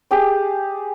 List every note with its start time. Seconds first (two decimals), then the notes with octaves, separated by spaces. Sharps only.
0.11 G4 G#4 D5